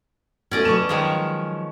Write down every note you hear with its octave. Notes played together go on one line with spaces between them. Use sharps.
B2 A3 C#4 D5 D#5
F#3 B4 A5 C#6 E7
D#3 F3 G#3